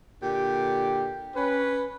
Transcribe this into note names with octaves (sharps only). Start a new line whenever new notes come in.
A#2 D3 G4
C#4 B4